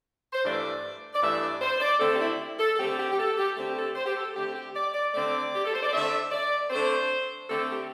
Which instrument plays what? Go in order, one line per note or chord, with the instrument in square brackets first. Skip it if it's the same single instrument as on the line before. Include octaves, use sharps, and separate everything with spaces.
[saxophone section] C5
G2 E3 A3 D4 D5
D5
G2 E3 A3 D4 E5
D5
C5
D5
D3 A3 C4 A4
G4
E4
A4
A4
D3 A3 C4 G4
G4
G4
A4
G4
D3 A3 C4 G4
A4
C5
G4
A4
D3 A3 C4 G4
G4
D5
D5
D3 A3 C4 D5
G4
A4
C5
D5
D3 A3 C4 E5
D5
D3 A3 C4 C5
D3 A3 C4 A4
G4